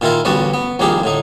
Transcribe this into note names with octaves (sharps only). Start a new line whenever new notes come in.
A#2 D#3 E4 F4 A#4
A1 D2 G3 B3 F#4 A5
B3
C2 F2 D#3 A#3 G4 G#4
A2 D3 D#4